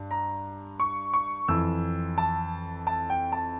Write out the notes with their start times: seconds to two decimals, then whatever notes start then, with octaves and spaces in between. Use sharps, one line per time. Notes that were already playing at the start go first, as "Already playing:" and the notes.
Already playing: G2
0.11 A#5
0.80 C#6
1.13 C#6
1.48 F2 E3 E6
2.18 A5
2.87 A5
3.10 G5
3.32 A5